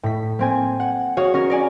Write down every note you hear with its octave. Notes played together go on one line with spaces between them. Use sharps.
A2 B6
A#3 C4 G#5
F#5
F#4 G#4 C#5 F5 F#5
C#4 A#4 C#5
A#4 D5 G#5